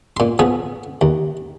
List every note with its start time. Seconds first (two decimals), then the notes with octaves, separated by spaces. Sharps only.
0.17 A#2 C6
0.39 F3 B3 G#4
1.01 D#2